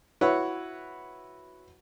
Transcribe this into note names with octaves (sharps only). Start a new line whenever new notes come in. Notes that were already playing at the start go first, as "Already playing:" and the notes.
E4 F#4 B4 C#5 E5 F#5